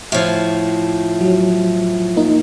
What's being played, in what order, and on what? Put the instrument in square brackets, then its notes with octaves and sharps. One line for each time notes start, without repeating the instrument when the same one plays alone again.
[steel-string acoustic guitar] A2 F3
[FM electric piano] F#3
A#3 D#4